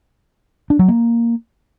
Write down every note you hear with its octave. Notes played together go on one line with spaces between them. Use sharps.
D4
F#3
A#3